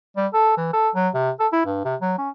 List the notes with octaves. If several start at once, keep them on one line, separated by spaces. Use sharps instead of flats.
G3
A4
E3
A4
F#3
C3
A4
E4
G2
C3
F#3
C#4